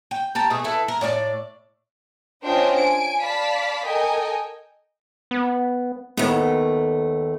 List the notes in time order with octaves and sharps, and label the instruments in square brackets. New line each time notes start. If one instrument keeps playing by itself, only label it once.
[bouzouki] G5
G4 A#4 A5
B2 A3 G#4
E4 A4 B4
A#4
A2 D4 G4 D5
[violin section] C#4 D4 F4 C5 D#5 G5
G#5 D7
D5 F5 A5 B5 B6
A4 A#4 D#5 G5 G#5
[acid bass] B3
[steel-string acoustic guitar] D#2 A3 [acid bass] B3